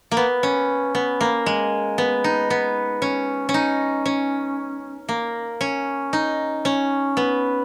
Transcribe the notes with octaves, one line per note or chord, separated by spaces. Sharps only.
A#3
B3
C#4
B3
A#3
G#3
B3
D#4
B3
C#4
C#4
D#4
C#4
A#3
C#4
D#4
C#4
B3